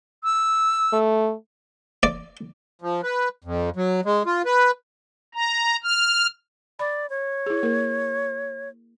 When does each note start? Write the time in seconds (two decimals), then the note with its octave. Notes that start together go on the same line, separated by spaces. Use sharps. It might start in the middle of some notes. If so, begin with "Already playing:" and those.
0.24 E6
0.93 A3
2.03 D5
2.82 F3
3.03 B4
3.44 F2
3.76 F#3
4.05 G#3
4.26 F4
4.46 B4
5.35 A#5
5.84 F6
6.79 D5 B5
7.10 C#5
7.46 E4 G#4
7.63 A#3 A#4